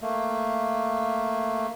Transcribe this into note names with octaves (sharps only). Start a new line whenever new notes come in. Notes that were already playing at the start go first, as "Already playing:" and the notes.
A3 A#3